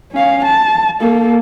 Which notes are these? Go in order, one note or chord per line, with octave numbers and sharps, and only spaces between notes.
C#4 F5
A5
A#3 A4